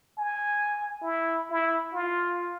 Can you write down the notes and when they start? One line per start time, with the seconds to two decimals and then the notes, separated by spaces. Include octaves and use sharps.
0.18 G#5
1.02 E4
1.51 E4
1.93 F4